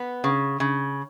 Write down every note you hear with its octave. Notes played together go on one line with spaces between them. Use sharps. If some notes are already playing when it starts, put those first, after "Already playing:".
Already playing: B3
C#3
C#3